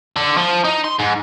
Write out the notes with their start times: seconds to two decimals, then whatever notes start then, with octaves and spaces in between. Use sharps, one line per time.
0.16 D3
0.37 F3
0.65 D#4
0.85 C6
1.00 G#2